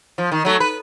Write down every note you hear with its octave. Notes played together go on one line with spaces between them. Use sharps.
F3
D#3
F#3 A3
B4